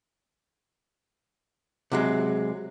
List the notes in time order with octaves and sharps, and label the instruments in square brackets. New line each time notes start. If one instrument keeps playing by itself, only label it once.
[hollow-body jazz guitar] C3 F#3 G#3